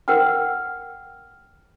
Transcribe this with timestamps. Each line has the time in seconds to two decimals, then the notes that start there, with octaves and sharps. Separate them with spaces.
0.08 A#4 F#5 G5 F6